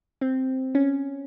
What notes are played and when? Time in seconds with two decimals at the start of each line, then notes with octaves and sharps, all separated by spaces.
0.21 C4
0.75 C#4